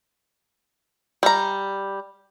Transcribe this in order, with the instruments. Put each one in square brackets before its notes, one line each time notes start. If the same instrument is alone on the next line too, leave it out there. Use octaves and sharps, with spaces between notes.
[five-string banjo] G3 A#5